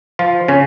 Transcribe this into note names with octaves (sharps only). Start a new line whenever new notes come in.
F3 F4
C#3 C#4